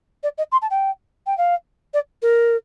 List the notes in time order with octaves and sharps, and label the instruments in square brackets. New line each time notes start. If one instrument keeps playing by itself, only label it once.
[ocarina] D5
D#5
C6
A5
G5
G5
F5
D5
A#4